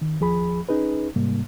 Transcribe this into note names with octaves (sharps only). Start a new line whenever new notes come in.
D#3
D#2 F3 G#4 B5
C#4 D#4 G#4 B4
G#2 C3 G3 A#3